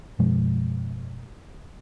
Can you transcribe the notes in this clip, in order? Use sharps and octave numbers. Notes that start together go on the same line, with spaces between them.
F#2 B2 F3 G#3